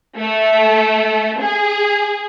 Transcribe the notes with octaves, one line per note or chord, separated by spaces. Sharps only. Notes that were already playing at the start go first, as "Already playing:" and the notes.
A3
G#4